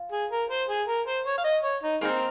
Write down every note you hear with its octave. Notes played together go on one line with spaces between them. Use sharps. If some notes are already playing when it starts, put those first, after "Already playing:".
Already playing: F4
G#4
A#4
C5
G#4
A#4
C5
C#5
F5
D#5
C#5
D#4
D#3 G#3 A#3 C4 D#4 A#4